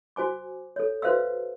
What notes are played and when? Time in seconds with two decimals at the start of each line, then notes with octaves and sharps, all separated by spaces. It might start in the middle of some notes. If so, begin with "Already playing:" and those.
0.16 F#4 C5 G#5 D6
0.76 A4 C#5
1.02 F#4 B4 C5 E5 F5 E6